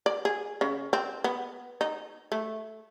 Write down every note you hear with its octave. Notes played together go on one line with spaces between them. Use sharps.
D5
G#4
C#3
C4
B3
D#4
A3